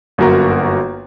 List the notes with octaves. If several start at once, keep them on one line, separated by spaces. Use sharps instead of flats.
G1 F#2 A#3 F#4 A#4 A#5